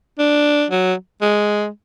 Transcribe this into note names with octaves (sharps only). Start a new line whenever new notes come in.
D4
F#3
G#3